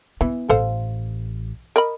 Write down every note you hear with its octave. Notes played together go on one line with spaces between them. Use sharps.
E3 B3
A1 A4 C5 F5
A#4 D#5 B5